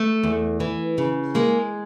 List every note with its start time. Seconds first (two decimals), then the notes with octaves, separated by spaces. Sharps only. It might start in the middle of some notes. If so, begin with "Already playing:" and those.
Already playing: A3
0.24 E2
0.60 E3
0.98 C#3
1.35 G#3 A#3